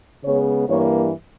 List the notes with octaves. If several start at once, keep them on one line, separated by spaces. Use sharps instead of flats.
C#3 G#3 B3 C#5
G2 E3 A#3 C#5